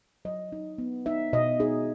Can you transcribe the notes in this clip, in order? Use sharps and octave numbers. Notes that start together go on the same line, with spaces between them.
F#3 D#5
D#4
B3
D#4 E5
B2 D#5
D#4 G#4